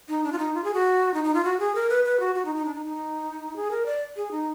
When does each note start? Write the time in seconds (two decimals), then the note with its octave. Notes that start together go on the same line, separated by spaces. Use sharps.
0.09 D#4
0.24 D4
0.32 F4
0.39 D#4
0.54 F4
0.64 G#4
0.74 F#4
1.14 D#4
1.24 D#4
1.34 F4
1.44 F#4
1.60 G#4
1.75 A#4
1.90 B4
2.05 B4
2.20 F#4
2.35 F#4
2.45 D#4
2.56 D#4
2.65 D4
2.75 D#4
2.86 D#4
3.56 G#4
3.71 A#4
3.86 D5
4.16 G#4
4.31 D#4